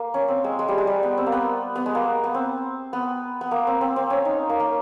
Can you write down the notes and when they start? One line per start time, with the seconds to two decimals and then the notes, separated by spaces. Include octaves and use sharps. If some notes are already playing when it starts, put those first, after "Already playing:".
Already playing: A#3
0.14 C#4
0.28 C4
0.44 G#3
0.59 G#3
0.68 G3
0.78 G#3
0.87 G3
1.03 B3
1.18 C4
1.26 A#3
1.32 B3
1.76 B3
1.86 G#3
1.95 A#3
2.24 B3
2.34 C4
2.93 B3
3.41 B3
3.51 A#3
3.67 C4
3.81 C4
3.96 C4
4.10 C#4
4.25 D#4
4.49 A#3
4.60 A#3